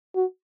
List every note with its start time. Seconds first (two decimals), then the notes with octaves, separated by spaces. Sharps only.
0.15 F#4